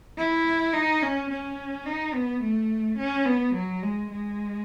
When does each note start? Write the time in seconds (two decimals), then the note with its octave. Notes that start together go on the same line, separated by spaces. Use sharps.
0.18 E4
0.73 D#4
1.02 C#4
1.30 C#4
1.86 D#4
2.14 B3
2.42 A3
2.98 C#4
3.26 B3
3.54 F#3
3.83 G#3
4.10 G#3